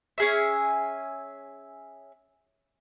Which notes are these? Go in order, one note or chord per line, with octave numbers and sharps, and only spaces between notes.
C#4 G#4 E5